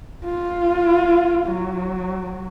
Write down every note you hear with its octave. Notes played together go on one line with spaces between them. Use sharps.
F4
F#3